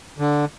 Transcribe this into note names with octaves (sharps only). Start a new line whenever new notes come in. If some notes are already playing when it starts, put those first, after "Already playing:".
D3